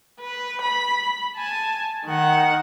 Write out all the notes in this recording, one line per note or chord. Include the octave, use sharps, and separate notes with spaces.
B4
B5
G#5 A5
D#3 F#5